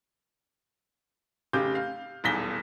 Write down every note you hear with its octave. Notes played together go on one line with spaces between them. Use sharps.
F1 C#3 G4 D6 G6
F5
D#1 B1 E2 A#6 B6 G7